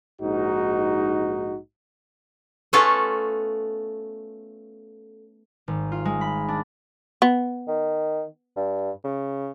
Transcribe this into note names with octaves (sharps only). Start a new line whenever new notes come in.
A#1 G#2 D#4 F#4
A3 B3 C#4 F4 A4 F5
G#1
F4
G#3
B5
D4
B3
D#3
G2
C#3